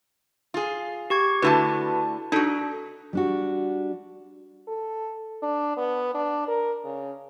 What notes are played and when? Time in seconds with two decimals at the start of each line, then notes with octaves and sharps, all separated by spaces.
0.54 F4 G#4
1.10 G4 C#6 G#6
1.42 D3 A3 E4 F#4 B4 A5
2.32 D4 D#4 F#4 A4
3.13 G3 D4 F#4
4.68 A4
5.42 D4
5.77 B3
6.14 D4
6.48 A#4
6.84 C#3